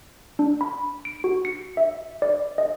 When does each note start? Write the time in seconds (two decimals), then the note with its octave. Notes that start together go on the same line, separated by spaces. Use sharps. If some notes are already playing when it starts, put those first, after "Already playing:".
0.39 D4
0.61 B5
1.05 D7
1.24 F#4
1.45 C#7
1.77 E5
2.22 D5
2.58 D#5